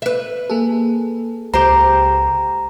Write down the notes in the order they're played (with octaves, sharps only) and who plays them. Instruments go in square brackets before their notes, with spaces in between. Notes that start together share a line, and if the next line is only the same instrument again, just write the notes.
[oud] B4 E5
[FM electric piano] A#3 G#4 A4
[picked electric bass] C#2 [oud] G4 C5 [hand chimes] A#5